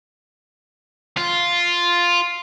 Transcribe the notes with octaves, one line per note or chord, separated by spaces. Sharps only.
F4